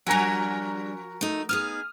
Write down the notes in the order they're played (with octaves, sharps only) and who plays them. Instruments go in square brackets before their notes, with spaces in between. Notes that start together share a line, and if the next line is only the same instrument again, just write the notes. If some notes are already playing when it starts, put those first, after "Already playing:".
[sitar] F3 F#4 A#4 [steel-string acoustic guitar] G3 D4 [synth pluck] F#5 G#5 A#5
[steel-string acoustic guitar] A3 D#4
[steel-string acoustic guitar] B3 D#4 G#4 [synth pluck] D#6 F6